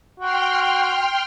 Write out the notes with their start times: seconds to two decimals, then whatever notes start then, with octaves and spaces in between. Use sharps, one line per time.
0.20 F#4 G5 C6 F6